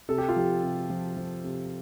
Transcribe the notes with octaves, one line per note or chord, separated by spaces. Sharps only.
C3 A4
G4
F4
F3 G4
C3
F3
F3
C3